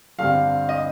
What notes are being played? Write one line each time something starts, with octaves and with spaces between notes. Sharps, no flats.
G2 D3 G3 C4 F5
D#5